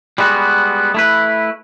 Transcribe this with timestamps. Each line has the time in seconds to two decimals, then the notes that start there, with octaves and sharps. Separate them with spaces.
0.18 G3 G#3 B3 F#4
0.94 A3 E4 B4